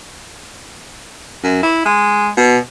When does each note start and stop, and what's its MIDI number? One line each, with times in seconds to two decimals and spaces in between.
1.43 1.59 42
1.63 1.84 64
1.85 2.29 56
2.37 2.57 47